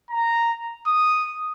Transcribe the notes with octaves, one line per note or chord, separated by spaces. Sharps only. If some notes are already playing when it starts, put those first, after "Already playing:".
A#5
D#6